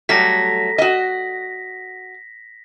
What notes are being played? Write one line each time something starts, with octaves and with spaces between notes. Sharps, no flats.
F#3 G3 A3 A#6 B6
F#4 D#5